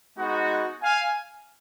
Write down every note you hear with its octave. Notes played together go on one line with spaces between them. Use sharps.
G#3 B3 D#4 F#4
F5 G#5